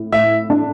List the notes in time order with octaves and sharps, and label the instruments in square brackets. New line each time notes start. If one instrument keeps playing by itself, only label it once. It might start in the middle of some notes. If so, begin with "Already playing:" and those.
Already playing: [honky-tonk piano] A2
[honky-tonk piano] A2 [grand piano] E5
[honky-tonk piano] D4